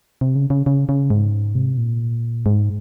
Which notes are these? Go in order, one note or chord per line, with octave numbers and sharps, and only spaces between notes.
C3
C#3
C#3
C#3
C#3
G#2
C3
A#2
G#2